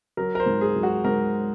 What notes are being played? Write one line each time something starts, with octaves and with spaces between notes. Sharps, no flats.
F#3 A#4
A#4
C5
G#2
G#4
F#3
F#4
G#2 A#4